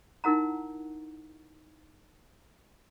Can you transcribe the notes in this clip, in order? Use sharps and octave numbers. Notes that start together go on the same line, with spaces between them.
D#4 E4 A#4 F#5 A#5